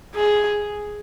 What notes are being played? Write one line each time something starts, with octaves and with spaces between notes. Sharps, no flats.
G#4